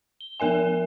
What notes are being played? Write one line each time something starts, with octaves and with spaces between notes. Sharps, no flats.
G7
F3 B3 A#4 E5 G#5